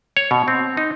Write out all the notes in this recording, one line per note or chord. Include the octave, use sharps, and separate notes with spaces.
C#5
B2
C4
D#4